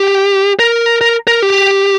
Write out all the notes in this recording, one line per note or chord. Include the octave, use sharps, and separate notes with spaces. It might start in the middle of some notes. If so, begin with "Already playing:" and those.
Already playing: G4
A#4
A#4
A#4
G4